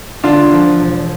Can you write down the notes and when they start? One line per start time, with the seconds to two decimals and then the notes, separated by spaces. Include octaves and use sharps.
0.24 D3 D4 F4
0.53 F3
0.80 E1